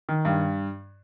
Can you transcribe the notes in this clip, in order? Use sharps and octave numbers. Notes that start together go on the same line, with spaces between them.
D#3
G2